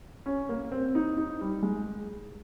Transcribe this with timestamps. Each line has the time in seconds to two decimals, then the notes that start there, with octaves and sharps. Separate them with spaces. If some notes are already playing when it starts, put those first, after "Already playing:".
0.26 C#4
0.49 A#3
0.72 C4
0.95 D#4
1.17 D#4
1.41 G3
1.63 G#3